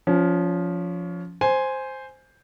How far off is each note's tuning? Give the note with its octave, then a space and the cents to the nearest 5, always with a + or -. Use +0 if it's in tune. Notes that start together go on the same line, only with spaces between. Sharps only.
F3 +5 C#4 +25
C5 +0 G#5 +0